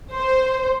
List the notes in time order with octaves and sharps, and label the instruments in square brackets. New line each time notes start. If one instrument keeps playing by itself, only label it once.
[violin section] C5